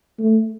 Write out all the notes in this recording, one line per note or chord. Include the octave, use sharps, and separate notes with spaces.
A3